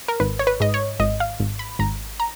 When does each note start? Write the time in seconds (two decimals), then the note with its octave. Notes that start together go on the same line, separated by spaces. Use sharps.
0.08 A#4
0.20 G#1 B4
0.39 C#5
0.47 B4
0.60 G#2 D#5
0.74 C#5
1.00 G#1 D#5
1.20 F5
1.40 G#1
1.59 B5
1.79 G#1 A#5
2.20 A#5